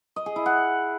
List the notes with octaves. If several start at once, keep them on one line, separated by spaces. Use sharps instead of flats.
D#5
G#4
E4
F#5